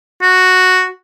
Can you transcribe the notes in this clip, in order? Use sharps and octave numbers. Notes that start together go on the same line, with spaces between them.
F#4